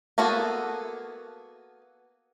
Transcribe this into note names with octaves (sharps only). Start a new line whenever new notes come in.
A#3 B3 F#4 G#4 A4